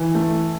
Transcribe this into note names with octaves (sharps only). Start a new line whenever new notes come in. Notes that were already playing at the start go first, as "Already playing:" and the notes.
Already playing: E3
A3